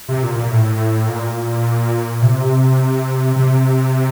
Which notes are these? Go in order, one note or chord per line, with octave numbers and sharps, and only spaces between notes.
C3
A#2
A#2
A2
A#2
C3
C3